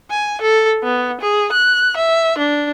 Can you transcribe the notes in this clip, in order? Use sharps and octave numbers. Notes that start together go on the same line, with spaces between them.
G#5
A4
B3
G#4
F#6
E5
D4